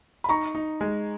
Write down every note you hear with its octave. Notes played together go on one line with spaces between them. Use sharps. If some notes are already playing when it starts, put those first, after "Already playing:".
B5
D#4 A#5 C#6
D#4
G#3